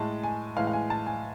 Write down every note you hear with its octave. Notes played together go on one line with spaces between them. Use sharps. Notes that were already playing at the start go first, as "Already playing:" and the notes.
Already playing: A2 G#3 A5
G#5
A2 E3 G#3 F5
F5
G#5
A5
G#5